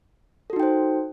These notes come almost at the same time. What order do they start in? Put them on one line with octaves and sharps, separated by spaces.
A4 F#4 D#4 G5 C5